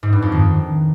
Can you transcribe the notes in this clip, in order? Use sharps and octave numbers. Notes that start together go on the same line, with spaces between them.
G#2
G2
F2
D#3